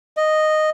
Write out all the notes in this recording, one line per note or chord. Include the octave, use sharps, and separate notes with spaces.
D#5